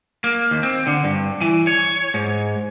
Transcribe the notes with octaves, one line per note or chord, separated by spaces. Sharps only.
A#3
D#2
C4
D3
G2
E3
C#5
G#2